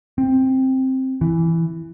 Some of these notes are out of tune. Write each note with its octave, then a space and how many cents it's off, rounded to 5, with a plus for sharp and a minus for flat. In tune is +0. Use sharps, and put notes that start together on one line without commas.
C4 +5
E3 +5